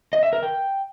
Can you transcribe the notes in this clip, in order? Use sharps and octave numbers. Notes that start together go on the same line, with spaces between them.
D#5
E5
A#4
G5